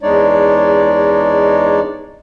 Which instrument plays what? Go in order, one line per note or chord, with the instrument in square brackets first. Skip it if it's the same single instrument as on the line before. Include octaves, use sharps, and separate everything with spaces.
[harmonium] E2 G#3 D4 D#4 C#5 D5